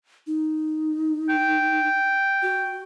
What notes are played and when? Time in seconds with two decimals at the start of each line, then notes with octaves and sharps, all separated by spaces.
0.27 D#4
1.29 G5
2.42 F#4